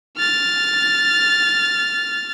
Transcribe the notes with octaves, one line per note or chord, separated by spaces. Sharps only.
F6 A6